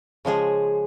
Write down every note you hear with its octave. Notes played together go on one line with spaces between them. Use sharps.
C#3 F3 G#3 G#4